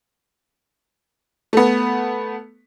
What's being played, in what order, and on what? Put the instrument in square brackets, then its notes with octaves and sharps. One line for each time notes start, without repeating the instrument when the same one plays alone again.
[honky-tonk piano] A3 B3